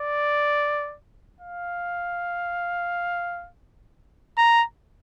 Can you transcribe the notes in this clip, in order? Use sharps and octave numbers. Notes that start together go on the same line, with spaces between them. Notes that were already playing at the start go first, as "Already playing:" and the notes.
Already playing: D5
F5
A#5